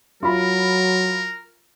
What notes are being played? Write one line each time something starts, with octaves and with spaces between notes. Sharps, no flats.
F#3 F4 A#4 B5